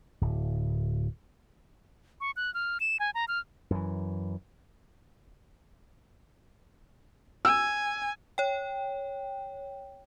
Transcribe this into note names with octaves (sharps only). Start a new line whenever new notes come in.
D1
C#6
F#6
F6
E7
G#5
A#5
F6
F#2 E3
G#5 E6
C#5 G5